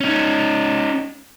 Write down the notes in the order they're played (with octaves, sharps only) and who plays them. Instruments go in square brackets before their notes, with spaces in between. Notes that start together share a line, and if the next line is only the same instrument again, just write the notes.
[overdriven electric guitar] C#4 D#4